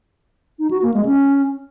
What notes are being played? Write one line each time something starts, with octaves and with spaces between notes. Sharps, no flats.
D#4
F#4
A#3
G#3
C#4